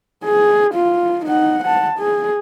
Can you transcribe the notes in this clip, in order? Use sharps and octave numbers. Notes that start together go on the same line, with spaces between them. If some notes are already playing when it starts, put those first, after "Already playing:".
G#4
F4
D#4 F#5
F#5 A5
G#4